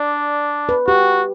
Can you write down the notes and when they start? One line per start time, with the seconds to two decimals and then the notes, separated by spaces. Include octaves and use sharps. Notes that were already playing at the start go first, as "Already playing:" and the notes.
Already playing: D4 D5
0.69 B4
0.87 F#4 G4